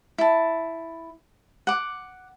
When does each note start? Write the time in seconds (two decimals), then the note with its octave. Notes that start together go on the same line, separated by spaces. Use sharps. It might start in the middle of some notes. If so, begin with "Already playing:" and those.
0.18 E4 A5
1.67 F#5 D6